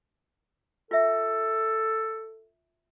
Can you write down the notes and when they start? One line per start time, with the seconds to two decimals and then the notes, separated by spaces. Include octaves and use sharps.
0.91 F4 A4 E5